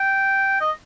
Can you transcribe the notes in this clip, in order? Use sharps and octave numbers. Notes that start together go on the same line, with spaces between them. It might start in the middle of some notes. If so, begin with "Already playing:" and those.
Already playing: G5
D#5